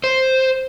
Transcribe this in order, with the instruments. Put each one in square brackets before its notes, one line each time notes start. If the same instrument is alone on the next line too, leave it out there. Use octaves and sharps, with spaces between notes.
[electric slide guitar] C5